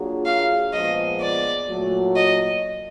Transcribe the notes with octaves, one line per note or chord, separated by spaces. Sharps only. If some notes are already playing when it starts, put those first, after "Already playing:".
Already playing: F#3 A#3 D4 F4 G#4
F5
A#2 F3 G#3 B3 D#5
D5
A#2 F#3 A3
D#5